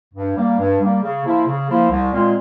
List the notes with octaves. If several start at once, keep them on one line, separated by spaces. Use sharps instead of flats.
G2
G3 A#3
G2
G3 A#3
C#3
F3 A#3 E4
C#3
F3 A#3 E4
C2
A#2 G#3 C4 F4